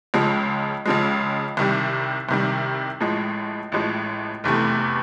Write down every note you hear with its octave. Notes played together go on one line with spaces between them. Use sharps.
C#2 C#3 F3 G#3
C#2 C#3 F3 G#3
C2 C3 D#3 G3
C2 C3 D#3 G3
A1 A2 F3 G#3
A1 A2 F3 G#3
F1 E2 C3 E3 A3